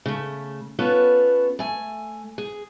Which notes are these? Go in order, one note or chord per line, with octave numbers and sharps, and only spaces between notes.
C#3 A3
B3 C#4 F4 A4 B4 C#5
A3 G#5
G#4